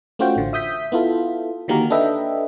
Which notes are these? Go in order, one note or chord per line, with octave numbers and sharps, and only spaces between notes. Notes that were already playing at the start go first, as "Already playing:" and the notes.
A3 C#4 F4 F#4 C5 G5
A1 D3
E5 D#6 G6 B6
B3 E4 F4 A4
D3 D#3 A#3 F#4 G4 A#4
D4 A4 B4 D#5 E5 G5